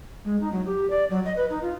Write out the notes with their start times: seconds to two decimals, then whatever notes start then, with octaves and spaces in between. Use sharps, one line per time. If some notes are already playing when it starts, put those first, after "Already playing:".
0.25 G#3
0.41 D#4
0.52 F#3
0.66 G4
0.90 D5
1.10 F#3
1.25 D#5
1.36 B4
1.50 D#4
1.62 F4